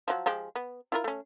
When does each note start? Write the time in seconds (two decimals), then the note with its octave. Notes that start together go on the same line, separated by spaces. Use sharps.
0.08 F3 F#3
0.26 F3 G#3 G4
0.56 B3
0.92 E4 F4 A#4
1.04 A3 C#4